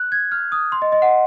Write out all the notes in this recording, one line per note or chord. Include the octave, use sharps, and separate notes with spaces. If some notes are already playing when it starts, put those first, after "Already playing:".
Already playing: F#6
G#6
F6
D#6
C6
D#5
D#5
F#5